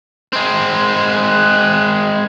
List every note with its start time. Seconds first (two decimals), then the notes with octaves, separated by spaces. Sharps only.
0.33 G#3 C4
1.07 F#6